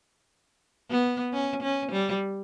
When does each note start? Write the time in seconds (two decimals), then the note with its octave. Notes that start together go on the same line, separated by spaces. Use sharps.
0.90 B3
1.33 C#4
1.63 C#4
1.92 G3